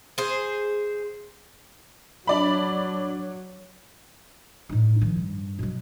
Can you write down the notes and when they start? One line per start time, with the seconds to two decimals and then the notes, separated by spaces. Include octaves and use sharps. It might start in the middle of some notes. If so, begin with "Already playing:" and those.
0.18 G#4 C5
2.27 F#3 D4 D5 B5
4.69 A2 D#4
5.01 D#3 F3
5.16 G2
5.59 B2 F#3